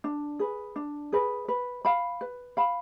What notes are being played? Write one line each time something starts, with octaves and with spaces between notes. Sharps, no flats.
D4
G#4 B4
D4
G#4 B4
B4
F5 B5
B4
F5 B5